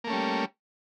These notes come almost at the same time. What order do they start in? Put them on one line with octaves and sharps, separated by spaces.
A#3 A3 C#4 G3